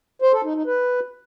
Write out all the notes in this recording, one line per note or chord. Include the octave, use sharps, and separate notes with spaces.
C5
A4
D#4
D#4
B4